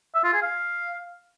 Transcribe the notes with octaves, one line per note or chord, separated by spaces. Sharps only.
E5
F4
G#4
F5